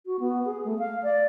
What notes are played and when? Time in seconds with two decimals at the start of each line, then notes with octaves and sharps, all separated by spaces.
0.06 F#4
0.20 B3
0.46 G#4
0.65 A3
0.79 F5
1.03 D5